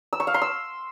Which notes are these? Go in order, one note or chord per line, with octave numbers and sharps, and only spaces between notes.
E6
C#6
F5
C6
E6